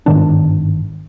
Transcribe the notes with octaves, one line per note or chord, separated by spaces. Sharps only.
G1 G#2 D#3 D4